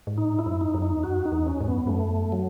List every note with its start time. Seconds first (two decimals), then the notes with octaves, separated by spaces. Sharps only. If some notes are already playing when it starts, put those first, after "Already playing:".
0.07 G#2
0.17 A2 D#4
0.39 E4
0.46 F#2
0.61 D#4
0.74 F#2
0.82 D#4
0.92 E2
1.03 F#2 F#4
1.25 D#4
1.32 E2
1.46 C#4
1.61 G#2
1.68 F#2 B3
1.78 E2
1.87 F#2 A3
2.32 F#3